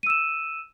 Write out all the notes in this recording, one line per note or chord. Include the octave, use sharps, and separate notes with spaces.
E6 D#7 E7